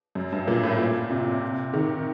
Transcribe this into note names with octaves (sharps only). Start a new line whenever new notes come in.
F#2
G2
A#2
A2
A#2
C3
D#3